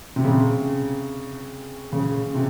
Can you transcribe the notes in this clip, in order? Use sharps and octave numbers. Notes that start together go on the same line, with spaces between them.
C3
C#3
C#3
C3